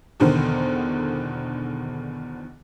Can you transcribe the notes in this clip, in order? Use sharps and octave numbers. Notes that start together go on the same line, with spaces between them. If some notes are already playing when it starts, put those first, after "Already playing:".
E2 B2 D3 D#3 C5